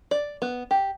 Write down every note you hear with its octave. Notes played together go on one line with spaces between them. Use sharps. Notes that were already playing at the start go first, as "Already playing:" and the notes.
D5
B3
G4